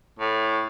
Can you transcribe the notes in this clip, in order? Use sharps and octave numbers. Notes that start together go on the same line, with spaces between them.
A2